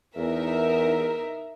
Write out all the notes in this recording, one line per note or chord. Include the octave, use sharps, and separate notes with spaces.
E2 D#4 A#4 E5